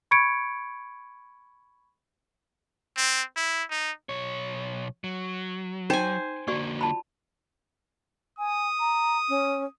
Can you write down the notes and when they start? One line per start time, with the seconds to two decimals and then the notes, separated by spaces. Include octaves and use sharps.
0.11 B5 C#6 G#6 C#7 D7
2.97 C4
3.36 E4
3.70 D#4
4.09 B1 C#5
5.04 F#3
5.90 D#4 C5 G5 G#5
6.48 D3 A#3 F#4 D5 C#6
6.81 F4 A5 B5
8.39 G#5 D#6
8.80 A#5
9.29 C#4